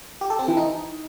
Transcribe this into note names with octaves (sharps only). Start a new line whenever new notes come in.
G4
A4
C4
E3
D#4